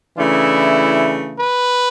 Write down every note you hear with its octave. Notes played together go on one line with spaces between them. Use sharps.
C#3 E3 A3 D4 E4
B4